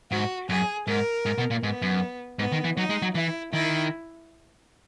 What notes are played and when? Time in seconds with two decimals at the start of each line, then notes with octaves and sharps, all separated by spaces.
0.11 G#2 F#4
0.49 F#2 G#4
0.87 G#2 A#4
1.26 G#2
1.38 B2
1.51 A#2
1.63 G#2 B3
1.82 F#2
2.39 G#2 B3
2.52 D#3
2.64 E3
2.77 F#3 D#4
2.90 G#3
3.02 F#3
3.15 E3 E4
3.53 D#3 E4